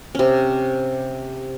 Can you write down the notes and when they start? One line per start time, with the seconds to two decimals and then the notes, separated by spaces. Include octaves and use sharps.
0.15 C3 C#4